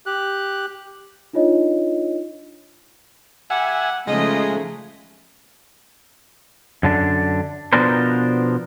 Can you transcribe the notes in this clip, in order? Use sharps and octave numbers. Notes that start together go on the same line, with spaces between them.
G4 F#6
D4 D#4 F4 C#5 D#5
G3 G4 E5 F#5 G#5
C#3 F3 G#3 A3 D#4 F4 D#5
F#2 D3 D4
B2 F3 B3 D4 A#4 C5